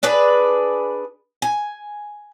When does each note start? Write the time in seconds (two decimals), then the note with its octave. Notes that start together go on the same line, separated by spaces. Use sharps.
0.03 D4 G#4 B4 D5
1.42 G#5